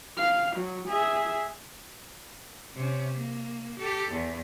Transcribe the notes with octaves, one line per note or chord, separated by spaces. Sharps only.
F5
F#3
G#4 E5
C3 C#4
A#3
G4 A4
E2